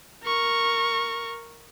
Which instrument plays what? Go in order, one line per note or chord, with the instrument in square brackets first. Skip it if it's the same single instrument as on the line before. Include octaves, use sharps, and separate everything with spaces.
[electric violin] A#4 C#6